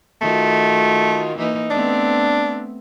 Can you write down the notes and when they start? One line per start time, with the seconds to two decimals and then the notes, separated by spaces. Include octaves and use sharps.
0.21 D#3 A3 F4 F#4
1.37 E3 A#3 D#4
1.71 A3 B3 C4 D4